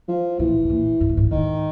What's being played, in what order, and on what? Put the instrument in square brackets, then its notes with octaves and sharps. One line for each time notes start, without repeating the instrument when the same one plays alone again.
[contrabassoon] F3
[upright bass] A#2 [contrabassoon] E3
[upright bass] B2
A#2
G#2
A2
G#2
[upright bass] G#2 [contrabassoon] D#3